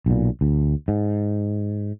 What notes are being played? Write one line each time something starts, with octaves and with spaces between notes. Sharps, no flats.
B1 A#2
D2
G#2